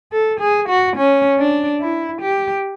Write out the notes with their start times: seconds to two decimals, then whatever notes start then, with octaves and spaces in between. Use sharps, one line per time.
0.12 A4
0.40 G#4
0.69 F#4
0.96 C#4
1.38 D4
1.80 E4
2.22 G4